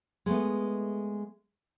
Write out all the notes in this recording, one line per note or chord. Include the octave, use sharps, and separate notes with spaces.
G#3 A3 B3